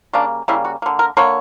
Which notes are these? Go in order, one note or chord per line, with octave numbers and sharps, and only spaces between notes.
C#3 G3 A#3 D4
C#3 G3 A#3 E4
F#4
D3 A#3
A#4
D3 A#3 C#5